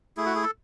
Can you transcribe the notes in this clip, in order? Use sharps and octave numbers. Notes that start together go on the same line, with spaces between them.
A3 E4 G#4
F#4
G#4
A4